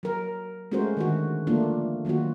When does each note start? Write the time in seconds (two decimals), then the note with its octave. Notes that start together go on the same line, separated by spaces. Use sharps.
0.03 F#3 A#4
0.72 G#3 A3 C#4 F#4 A#4 C5
0.97 D3 D#3 F#4
1.47 F3 A3 A#3 D4 F4
2.05 D#3 F#3 A#3 F4 F#4